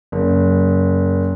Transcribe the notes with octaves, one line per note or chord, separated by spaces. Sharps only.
F#1